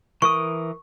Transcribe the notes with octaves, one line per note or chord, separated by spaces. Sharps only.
E3 A#4 C#6 D#6